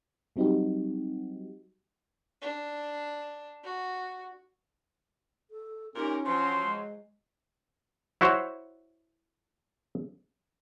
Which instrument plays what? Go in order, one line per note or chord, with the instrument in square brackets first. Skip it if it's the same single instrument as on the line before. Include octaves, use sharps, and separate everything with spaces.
[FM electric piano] F#3 G3 C4 D#4 F#4 G4
[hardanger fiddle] D4
F#4
[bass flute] A4
[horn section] A#2 G4 A#4 [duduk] C#4 [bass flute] D#4
[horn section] F3 F#3 [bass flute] D4 [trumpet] C6
[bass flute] G#3
[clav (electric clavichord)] E4 F#4 C5 C#5